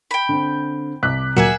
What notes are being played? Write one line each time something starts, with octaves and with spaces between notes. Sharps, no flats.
G5 B5
D3 C4
C2 D6 F#6 B6
D2 A#2 F#3 G#4 A#4 E5 F#5 E7